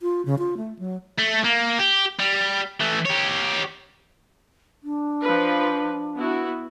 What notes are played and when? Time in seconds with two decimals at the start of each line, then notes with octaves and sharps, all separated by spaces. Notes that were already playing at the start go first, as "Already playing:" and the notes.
0.02 F4
0.26 C#3
0.39 F4
0.57 A3
0.79 F#3
1.19 A3
1.45 A#3
1.79 G4
2.20 G3
2.80 E3 A3
3.05 G4 C#5
4.83 D4
5.22 F3 B4
6.17 B3 E4 F#4